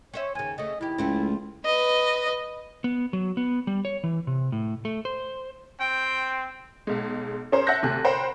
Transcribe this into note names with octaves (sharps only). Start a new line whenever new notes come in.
C#4 C5 C#5 E5
D#2 C#3 G#5
C#3 A3 D#5
D#2 E4 G4
C#2 F3 A3 C4
B4 D#5
B3
F#3
B3
G3
C#5
E3
C3
A2
A3
C5
C4 G5
B1 G#3
C#4 G#4 A#4 C5
E5 F#5 A5 F#6 G6 A#6
D2 C3 G#5 F#6
A#4 C5 F#5 G5 B5 C6